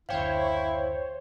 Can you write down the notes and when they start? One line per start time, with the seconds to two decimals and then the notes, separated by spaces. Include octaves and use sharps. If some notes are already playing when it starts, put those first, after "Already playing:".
0.09 F#1 D2 E4 C5 C#5 F5 G5